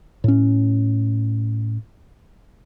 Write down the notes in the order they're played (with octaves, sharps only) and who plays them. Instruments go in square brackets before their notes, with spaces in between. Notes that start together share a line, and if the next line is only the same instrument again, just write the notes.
[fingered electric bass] A2 C#4